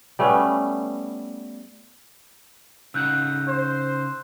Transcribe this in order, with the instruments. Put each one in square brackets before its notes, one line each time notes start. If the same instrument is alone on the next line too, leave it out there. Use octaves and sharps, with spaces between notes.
[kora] G3 A3 B3 C#4
[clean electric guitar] C#3 D#4 F#5 [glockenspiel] E6 F#6 G6
[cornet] C5